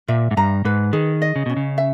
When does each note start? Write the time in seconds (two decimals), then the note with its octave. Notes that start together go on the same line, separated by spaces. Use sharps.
0.08 A#2 E5
0.31 G#2
0.37 G2 A#5
0.65 G#2 B4
0.93 D#3 G#4
1.22 D#5
1.36 C#3
1.46 B2 C#4
1.57 C#3
1.78 E5